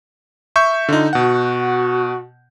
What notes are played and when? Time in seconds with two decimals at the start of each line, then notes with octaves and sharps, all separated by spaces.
0.56 E5 C#6 G6
0.89 D3 D#4 F4
1.13 B2 F#4 F#5